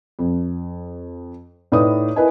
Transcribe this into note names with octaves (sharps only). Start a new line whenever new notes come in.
F2
A2 D#4 B4 D5 D#6
E4 A#4 B4 D#5 G#5